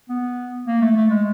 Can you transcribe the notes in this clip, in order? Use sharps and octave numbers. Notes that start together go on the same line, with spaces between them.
B3
A#3
A3
A3
G#3